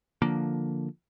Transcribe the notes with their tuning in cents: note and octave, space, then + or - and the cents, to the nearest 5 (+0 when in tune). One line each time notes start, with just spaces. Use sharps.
D3 +0 F3 +0 A#3 +0